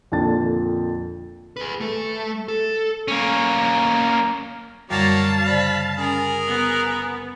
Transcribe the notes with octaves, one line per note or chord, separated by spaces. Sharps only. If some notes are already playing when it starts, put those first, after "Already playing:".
F2 A#2 D3 A5 A6
G#4 B4
A3
A4
A#3 C#4
F#2 D3 F#3 G3 A#3 F5 A5
C#3 C5 D5 B5
C#4 G#4 A#4
B3